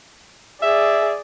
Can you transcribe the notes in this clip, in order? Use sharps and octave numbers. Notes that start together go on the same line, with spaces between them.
G#4 D5 E5